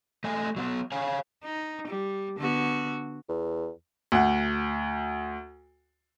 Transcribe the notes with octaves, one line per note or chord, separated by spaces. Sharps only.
A3 D#5 G#5
F#3 A#3 B3
C#5 F5 G#5
D#4
G3
D3 B3 F#4
E2
D2 F#5